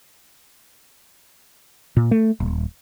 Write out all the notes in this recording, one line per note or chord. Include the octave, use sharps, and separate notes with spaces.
A#2
A3
D#1